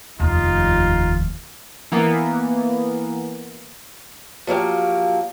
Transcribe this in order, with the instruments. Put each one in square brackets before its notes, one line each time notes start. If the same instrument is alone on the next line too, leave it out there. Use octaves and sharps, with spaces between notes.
[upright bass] F1 D#2 [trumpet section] D#4 F4
[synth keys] E3 A#3 B3
[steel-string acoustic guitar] F3 F#3 A#3 G4